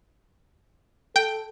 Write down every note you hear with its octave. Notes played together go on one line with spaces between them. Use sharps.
A4 G5